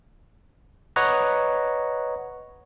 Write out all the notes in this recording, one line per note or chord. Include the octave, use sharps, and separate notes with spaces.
B4 C#5 D#5 F#5 A#5